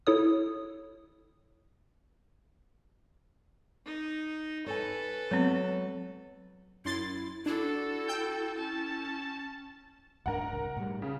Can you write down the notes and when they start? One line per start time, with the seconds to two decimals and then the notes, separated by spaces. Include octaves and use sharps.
0.07 E4 A4 C#5 D#6
3.86 D#4
4.66 A4 B4 C#5 G#5
5.31 F#3 G#3 B3 C4
6.85 F#2 E4 C6 A6
7.46 D4 E4 F#4 A4
8.08 G5 E6 G6
8.58 C#4 A5
10.26 D1 G#2 D4 A#4 F#5
10.53 C2
10.77 A2 G3
11.02 C#3